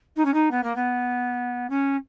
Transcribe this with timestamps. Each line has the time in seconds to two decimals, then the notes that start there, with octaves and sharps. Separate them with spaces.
0.16 D#4
0.25 C#4
0.33 D#4
0.51 B3
0.63 A#3
0.75 B3
1.69 C#4